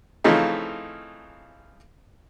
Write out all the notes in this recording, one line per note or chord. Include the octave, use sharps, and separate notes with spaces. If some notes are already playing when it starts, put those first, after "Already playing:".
C#3 E3 F3 A3 C4 D#4